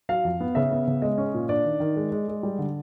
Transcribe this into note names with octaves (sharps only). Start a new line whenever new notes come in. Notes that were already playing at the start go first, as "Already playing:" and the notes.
F#3 F5
F2
B3
C#3 E5
B3
C#3
G#3 D#5
C#4
A#2
D4 D5
D#3
D#3
G#3
G#3
G#3
G3
D3